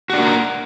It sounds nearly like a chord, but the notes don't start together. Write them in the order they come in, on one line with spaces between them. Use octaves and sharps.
F#4 D4 A#3 A#4